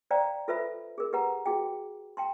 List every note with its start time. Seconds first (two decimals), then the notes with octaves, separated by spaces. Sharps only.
0.11 C5 D5 F5 G5 A#5
0.48 F4 A4 B4 C5 E5 B5
0.98 G#4 A#4
1.13 G4 B4 F#5 A#5
1.46 F#4 G#4 G5
2.17 G5 A5 C6